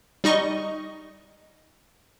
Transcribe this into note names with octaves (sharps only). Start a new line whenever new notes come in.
G3 D#4 D#5 C#6